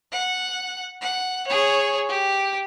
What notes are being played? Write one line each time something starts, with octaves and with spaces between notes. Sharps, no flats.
F#5
F#5
G#4 C#5
G4